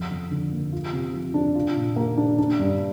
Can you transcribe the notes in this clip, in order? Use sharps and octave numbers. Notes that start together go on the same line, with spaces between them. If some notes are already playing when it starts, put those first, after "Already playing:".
Already playing: F2
F2
D3
A#3
F4
C3
F3
D4
F4
A#2
A#3
D4
D4
G2